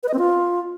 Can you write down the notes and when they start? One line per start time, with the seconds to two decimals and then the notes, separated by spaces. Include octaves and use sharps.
0.03 B4
0.08 D#5
0.14 C4
0.19 F4